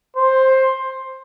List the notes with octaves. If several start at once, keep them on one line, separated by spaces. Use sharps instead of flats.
C5